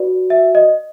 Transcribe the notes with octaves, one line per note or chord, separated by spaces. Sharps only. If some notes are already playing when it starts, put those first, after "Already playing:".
Already playing: F#4 B4 D5
E5
D#5